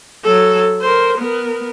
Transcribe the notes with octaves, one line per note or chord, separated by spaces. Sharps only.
F#3 A4
A#4 C5
B3 A#4